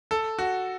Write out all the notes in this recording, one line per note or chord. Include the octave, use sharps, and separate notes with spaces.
A4
F#4